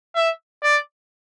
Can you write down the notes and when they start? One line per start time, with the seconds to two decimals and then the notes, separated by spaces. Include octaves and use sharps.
0.15 E5
0.63 D5